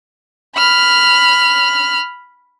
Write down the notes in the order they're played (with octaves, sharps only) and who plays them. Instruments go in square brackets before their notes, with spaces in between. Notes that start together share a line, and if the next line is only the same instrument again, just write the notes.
[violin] B5 F6